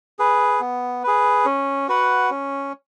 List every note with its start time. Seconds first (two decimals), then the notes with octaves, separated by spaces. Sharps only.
0.19 G#4 B4
0.60 B3
1.03 G#4 B4
1.45 C#4
1.88 F#4 B4 F#5
2.30 C#4